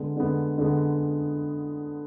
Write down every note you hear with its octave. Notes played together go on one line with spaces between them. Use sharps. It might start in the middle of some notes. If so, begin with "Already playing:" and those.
Already playing: D3 G#3 B3
D3 G#3 B3
D3 G#3 B3